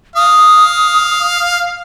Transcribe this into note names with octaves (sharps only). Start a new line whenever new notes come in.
F5 D#6